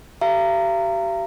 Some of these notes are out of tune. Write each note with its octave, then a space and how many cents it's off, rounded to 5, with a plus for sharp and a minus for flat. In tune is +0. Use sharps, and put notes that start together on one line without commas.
G4 -30 F5 -45 A#5 -20